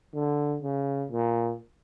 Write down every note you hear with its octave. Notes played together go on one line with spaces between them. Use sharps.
D3
C#3
A#2